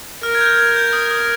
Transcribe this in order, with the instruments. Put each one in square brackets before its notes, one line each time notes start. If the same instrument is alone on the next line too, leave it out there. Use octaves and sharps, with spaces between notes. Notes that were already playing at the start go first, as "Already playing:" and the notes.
[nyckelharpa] A#4 [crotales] F6
[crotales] G#6
G6
G#6
G6
D#6
D#6